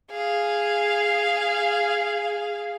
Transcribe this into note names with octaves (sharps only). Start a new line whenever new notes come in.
G#4 F5